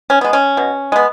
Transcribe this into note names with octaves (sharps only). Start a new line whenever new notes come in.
C#4
G#3 B3
C#4
B2
G#3 B3